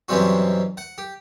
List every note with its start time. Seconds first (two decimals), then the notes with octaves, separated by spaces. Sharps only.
0.08 F#2 B2 E3 G3 C4 F#4
0.77 F#5
0.98 G4